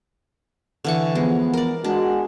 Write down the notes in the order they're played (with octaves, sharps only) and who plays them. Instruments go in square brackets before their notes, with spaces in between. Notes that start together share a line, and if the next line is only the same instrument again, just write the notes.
[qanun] D3 E3 C#6
[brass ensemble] F3 B3 [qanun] G#3
[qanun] A#4 D5
[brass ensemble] G#3 F#4 [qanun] D4